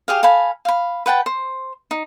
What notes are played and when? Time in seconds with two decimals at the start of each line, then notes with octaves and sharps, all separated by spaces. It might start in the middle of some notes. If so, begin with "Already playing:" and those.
0.08 G4 G#4 F5
0.23 A4 F5 G#5 B5
0.65 F5 B5
1.06 B4 F#5 G5 A5
1.26 C5
1.91 D#4